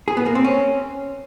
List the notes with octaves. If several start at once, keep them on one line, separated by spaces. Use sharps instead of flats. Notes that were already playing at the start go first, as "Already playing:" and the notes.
G#4
B3
A#3
C4
C#4